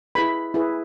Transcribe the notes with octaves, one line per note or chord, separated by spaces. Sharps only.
E4 G#4 B4 B5
E4 G#4 B4